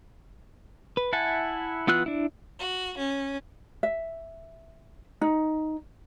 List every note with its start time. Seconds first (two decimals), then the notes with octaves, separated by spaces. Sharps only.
0.97 B4
1.13 E4 E5 F#5 G#5 A5
1.87 E3 B3 F4 E6 F#6
2.06 D4 E4
2.59 F#4
2.98 C#4
3.83 E5
5.21 D#4